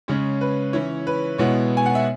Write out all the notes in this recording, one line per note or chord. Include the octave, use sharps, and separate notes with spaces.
C#3 G#3 C#4 C#5
B4
E3 C#4 E4 C#5
B4
B2 G#3 B3 E4 C#5
G#5
F#5
E5